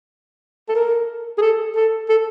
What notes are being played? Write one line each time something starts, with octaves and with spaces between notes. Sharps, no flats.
A4
A#4
G#4
A4
A4
A4